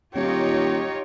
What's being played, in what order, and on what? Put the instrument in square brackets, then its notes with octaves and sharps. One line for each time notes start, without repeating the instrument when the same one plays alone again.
[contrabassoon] D#1 [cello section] D#4 F4 C#5 [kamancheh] G4